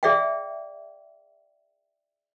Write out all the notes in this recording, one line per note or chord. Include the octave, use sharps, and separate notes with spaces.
G#4 D5 E5 F5 G5